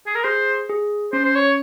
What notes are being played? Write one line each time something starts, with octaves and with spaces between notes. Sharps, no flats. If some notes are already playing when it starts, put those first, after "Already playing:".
G#4
A#4
G#4 C5
G#4
C#4 C5
C5
C#5